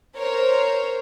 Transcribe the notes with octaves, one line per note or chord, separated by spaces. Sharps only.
A#4 C5 C#5